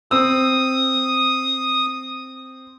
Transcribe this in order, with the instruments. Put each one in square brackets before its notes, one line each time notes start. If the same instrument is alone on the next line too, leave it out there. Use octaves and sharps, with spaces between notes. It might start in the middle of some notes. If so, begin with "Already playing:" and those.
[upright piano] C4 E6 [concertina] D#6